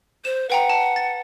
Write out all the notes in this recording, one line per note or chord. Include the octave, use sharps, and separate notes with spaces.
C5 E7
B4 F#5 G5 A#5
A5
A6